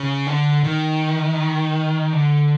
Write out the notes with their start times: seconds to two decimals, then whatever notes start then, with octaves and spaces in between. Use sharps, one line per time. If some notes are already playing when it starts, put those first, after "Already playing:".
Already playing: C#3
0.27 D3
0.64 D#3
2.13 D3